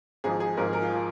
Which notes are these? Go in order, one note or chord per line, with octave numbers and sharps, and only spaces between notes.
G#1 G#2 F3 G#4
G#4
G#1 G#2 F3 A#4
A#4
F4
F3